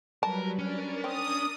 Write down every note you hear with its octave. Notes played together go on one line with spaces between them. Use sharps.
F#3 G3 A#4 B4 A5
C#4 D4 A#4 D5
C4 D#6